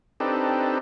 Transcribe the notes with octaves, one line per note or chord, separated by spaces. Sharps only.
C4 D4 D#4 G4 A4 B4